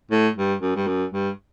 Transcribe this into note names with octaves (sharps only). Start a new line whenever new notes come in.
A2
G2
F#2
G2
F#2
G2